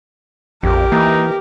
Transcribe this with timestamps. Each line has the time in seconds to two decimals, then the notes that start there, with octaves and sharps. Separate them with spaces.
0.63 A#1 F2 G4 A#4
0.92 E3 A#3 D#4